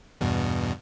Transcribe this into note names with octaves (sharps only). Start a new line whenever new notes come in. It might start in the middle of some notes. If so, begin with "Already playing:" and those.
E2 G2 B2